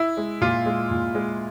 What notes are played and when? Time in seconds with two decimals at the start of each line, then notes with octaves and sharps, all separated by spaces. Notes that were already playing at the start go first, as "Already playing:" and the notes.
Already playing: E4
0.17 G#3
0.41 A#2 F4
0.66 G#3
0.91 A#2
1.15 G#3